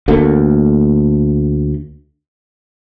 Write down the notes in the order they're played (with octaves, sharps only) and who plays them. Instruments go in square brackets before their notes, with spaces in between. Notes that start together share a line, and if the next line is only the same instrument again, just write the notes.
[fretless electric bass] D2 A3 A#3